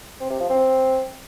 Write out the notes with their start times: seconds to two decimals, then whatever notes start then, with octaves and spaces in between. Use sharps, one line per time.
0.20 C4
0.30 C3
0.40 F3
0.50 C4